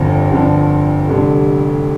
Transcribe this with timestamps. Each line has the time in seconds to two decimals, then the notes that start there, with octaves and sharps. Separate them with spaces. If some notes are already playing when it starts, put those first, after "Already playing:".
Already playing: G1 F2 D3 F3
0.31 G1 F2 D3 F3
1.08 F1 F2 D3 G3